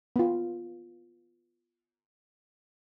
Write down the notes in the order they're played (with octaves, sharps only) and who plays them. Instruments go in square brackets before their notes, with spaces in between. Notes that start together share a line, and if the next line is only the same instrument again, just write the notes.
[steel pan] B3 F4